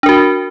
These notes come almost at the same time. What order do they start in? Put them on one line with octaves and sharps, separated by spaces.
D4 A#4 F#4